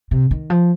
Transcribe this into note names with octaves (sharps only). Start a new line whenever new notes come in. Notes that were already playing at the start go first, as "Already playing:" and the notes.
C3
D#3
F3